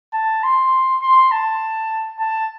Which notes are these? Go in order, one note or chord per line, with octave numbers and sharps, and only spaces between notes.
A5
C6
C6
A5
A5